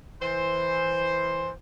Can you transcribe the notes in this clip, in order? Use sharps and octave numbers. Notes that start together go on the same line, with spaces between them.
E3 C5